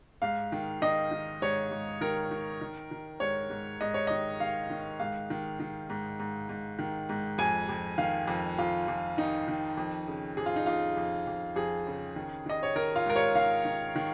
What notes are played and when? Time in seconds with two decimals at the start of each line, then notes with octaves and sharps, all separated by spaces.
0.22 G#2 F5
0.52 D#3
0.82 D#3 D#5
1.11 D#3
1.42 G#2 C#5
1.71 G#2
2.01 D#3 A#4
2.31 D#3
2.61 D#3
2.91 D#3
3.20 G#2 C#5
3.50 G#2
3.81 G#2 D#5
3.94 C#5
4.07 D#3 D#5
4.40 D#3 F5
4.70 D#3
5.00 G#2 F5
5.30 D#3
5.60 D#3
5.90 G#2
6.20 G#2
6.49 G#2
6.79 D#3
7.09 G#2
7.38 F2 G#5
7.69 F2
7.98 D#3 F5
8.27 F2
8.58 F2 F4
8.88 F2
9.18 D#3 D#4
9.48 D#3
9.77 F2
10.07 C#3
10.37 F2 G#4
10.46 F4
10.56 D#4
10.66 F2 F4
10.97 F2
11.27 F2
11.56 F2 G#4
11.87 C#3
12.16 D#3
12.46 D#3 D#5
12.63 C#5
12.76 D#3 A#4
12.96 F4
13.06 G#2 A#4
13.16 C#5
13.35 D#3 F5
13.65 D#3
13.96 D#3